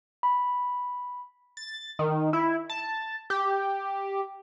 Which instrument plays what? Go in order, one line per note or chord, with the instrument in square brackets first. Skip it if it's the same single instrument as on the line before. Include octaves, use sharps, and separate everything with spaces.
[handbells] B5
[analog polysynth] A6
D#3
E4
A5
G4